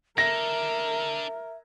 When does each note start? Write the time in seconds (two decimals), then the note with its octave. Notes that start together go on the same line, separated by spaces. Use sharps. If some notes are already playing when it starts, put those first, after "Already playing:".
0.18 D4 A4 A#4 E5 A#6